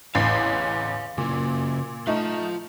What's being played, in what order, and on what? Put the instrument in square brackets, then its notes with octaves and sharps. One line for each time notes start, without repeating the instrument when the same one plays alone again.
[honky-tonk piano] A1 E2 C7 [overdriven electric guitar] C#5 F5
[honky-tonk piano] A#2 [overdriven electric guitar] C#3 A#3
[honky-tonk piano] A3 D#4 [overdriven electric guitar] F4 A5